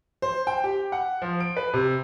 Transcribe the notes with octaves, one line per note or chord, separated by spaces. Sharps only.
C5
G5
G4
F#5
F3
D7
B4
C3